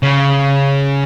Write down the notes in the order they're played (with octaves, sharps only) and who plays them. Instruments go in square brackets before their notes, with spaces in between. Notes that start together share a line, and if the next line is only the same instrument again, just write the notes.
[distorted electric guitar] C#3